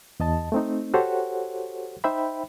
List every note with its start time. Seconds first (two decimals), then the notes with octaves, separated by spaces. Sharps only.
0.20 E2 D#5 A5
0.52 A3 C4 D#4
0.94 F#4 G4 A4 C5 C#5 F#5
2.04 D#4 C5 E5 G5 B5